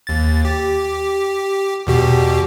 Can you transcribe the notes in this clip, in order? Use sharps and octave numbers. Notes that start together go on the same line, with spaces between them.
D#2 A6
G4
E2 B2 G4